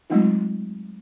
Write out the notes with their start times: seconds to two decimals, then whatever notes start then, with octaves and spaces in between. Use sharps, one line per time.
0.10 F#3 G#3 A3 C4 D#4 F4